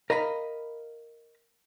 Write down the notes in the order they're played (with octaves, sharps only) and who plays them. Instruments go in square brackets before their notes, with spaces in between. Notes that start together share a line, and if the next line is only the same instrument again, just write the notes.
[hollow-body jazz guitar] A#4 D#5 F5 A#5 B5